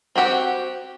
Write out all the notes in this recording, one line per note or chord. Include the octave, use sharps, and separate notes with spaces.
C4 F#4 G4 F#5